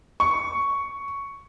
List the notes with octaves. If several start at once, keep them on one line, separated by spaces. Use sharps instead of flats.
C#6